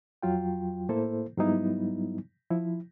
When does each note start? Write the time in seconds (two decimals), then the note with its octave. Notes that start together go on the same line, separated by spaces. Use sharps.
0.23 F2 F#3 F4 G5
0.89 A2 A#3 E4 A4 C5
1.37 G#2 F#3 G3 B3 D#4 E4
2.51 F3 E4